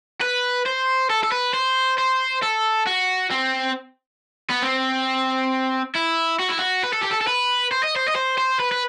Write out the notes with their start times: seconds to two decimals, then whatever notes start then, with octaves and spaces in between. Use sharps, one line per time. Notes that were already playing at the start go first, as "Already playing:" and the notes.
0.21 B4
0.66 C5
1.10 A4
1.23 A4
1.32 B4
1.54 C5
1.98 C5
2.43 A4
2.86 F#4
3.30 C4
4.50 B3
4.62 C4
5.95 E4
6.40 F#4
6.49 E4
6.59 F#4
6.84 B4
6.93 A4
7.02 G4
7.11 A4
7.21 A4
7.27 B4
7.72 C5
7.84 D#5
7.97 C5
8.09 D#5
8.16 C5
8.38 C5
8.60 B4
8.72 B4